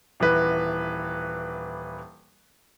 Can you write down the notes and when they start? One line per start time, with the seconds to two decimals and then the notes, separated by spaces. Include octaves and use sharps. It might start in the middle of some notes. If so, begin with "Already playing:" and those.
0.20 D#1 E3 B4